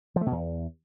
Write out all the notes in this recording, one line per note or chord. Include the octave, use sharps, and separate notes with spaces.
F3
A3
B2
E2